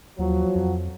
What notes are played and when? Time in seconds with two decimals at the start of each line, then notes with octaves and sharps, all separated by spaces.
0.19 D#2 F3 F#3
0.55 F2